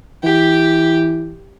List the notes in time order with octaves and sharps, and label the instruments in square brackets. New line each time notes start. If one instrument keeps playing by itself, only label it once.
[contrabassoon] E3 [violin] G4